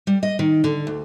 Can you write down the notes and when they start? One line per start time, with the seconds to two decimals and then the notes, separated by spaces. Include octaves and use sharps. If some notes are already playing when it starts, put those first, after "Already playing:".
0.07 G3
0.23 D#5
0.39 D#3
0.64 D3
0.87 D2